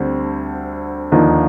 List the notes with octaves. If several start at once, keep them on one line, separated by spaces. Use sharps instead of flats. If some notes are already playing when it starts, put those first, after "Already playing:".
Already playing: D2 D3 G3 C4
D#2 D3 F3 A#3 D#4